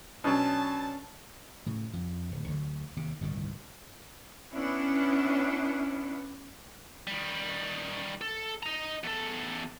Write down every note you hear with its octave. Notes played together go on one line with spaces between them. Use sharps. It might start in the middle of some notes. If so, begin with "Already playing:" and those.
B2 F#3 C#4 D4 A5
A2 C#3
F2
D1
D2 D3 D#3 F#3
D#2 C3
G1 C2 A2 D#3
B3 C#4 D4 E4
D#3 G3
A4
D#5 A#5
E2 A4